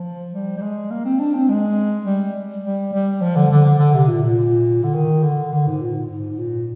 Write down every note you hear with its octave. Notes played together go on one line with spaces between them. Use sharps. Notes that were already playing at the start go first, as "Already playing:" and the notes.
Already playing: F3
G3
G3
G#3
A#3
C4
D4
C4
G#3
G3
G3
G3
F3
D3
D3
D3
D3
C3
A#2
A#2
D3
D#3
D3
D3
G#2
A#2
G#2
G#2
A#2